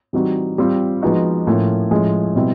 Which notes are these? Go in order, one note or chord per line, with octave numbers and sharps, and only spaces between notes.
E3 G3 C4 D#4 F#4
G3 C4 F4
F3 G#3 B3 D#4 F#4
A2 F3 A#3 C#4 F4
A2 F3 G#3 C#4
B2 G3 C4 E4